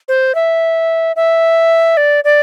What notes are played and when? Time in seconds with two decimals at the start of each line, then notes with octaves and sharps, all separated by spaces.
0.08 C5
0.35 E5
1.16 E5
1.97 D5
2.24 D5